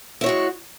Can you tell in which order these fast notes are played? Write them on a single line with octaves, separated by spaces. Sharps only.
E4 C#5 F#4 G#3